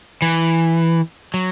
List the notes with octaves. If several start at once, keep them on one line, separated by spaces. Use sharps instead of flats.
E3
F#3